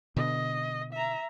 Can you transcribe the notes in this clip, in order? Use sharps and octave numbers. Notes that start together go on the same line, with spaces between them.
B2 D3 D#5
E5 A#5